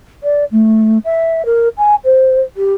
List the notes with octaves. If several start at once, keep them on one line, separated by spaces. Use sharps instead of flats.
D5
A3
E5
A#4
G#5
C5
G4